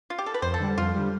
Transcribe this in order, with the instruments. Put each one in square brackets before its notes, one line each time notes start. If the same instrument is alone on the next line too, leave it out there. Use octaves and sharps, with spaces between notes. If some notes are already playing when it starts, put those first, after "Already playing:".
[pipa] F4
G4
A4
B4
[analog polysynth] F2 [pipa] C5
[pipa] A4
[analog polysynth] D3 G3
[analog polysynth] F2 [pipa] F4
[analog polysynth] D3 G3